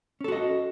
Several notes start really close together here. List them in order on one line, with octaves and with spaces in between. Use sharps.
C#4 A4 F#4 D#5